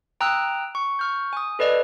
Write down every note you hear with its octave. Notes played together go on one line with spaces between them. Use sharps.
G5 A#5 D#6 E6 F#6
C#6
C#6 F6 G6
G#5 D#6
A4 B4 D5 D#5